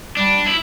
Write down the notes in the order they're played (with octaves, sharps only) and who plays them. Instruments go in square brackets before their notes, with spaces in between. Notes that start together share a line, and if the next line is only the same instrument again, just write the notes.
[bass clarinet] G3 [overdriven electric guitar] D4
[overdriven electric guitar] E4